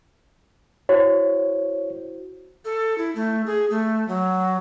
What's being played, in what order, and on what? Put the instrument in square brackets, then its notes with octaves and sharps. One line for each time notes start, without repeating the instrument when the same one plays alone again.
[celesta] E4 F#4 C5 [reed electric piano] C#5
[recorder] A4
E4
A3
G#4
A3
F#3